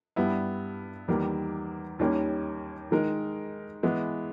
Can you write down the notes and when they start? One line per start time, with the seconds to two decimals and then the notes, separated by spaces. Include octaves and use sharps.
0.16 G2 G3 B3 E4
1.08 E2 D#3 G3 A#3
1.99 D#2 D#3 G3 A#3 C#4
2.91 D#3 G#3 D#4 A#4
3.83 E3 G#3 B3 E4